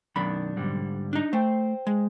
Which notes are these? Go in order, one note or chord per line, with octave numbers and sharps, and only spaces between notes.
B1 F#2 D#3 D4 B5
G#2 D3 G3
D4 D#4
A3 C5 G5
G#3